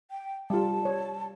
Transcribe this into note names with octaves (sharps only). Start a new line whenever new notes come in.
G5
G3 F4 A5
C#5 D5